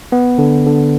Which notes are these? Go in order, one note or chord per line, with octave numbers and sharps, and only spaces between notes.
B3
D3
D3